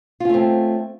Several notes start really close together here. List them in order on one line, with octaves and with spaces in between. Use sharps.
F4 C#4 A3 C4